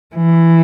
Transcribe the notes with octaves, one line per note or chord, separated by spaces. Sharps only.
E3